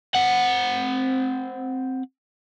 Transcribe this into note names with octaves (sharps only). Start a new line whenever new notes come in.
C4 F#5